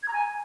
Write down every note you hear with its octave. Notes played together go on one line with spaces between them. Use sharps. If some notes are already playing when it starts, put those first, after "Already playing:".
G#6
A#5
G#5